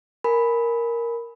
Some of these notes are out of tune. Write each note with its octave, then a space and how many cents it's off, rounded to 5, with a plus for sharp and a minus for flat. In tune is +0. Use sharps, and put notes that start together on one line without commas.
A#4 +0 G#5 +15 B5 +0